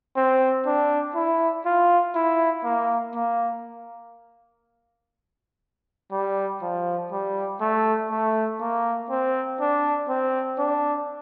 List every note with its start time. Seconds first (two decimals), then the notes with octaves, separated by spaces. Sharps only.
0.16 C4
0.66 D4
1.15 E4
1.66 F4
2.15 E4
2.64 A#3
3.15 A#3
6.12 G3
6.62 F3
7.12 G3
7.60 A3
8.10 A3
8.60 A#3
9.10 C4
9.60 D4
10.09 C4
10.58 D4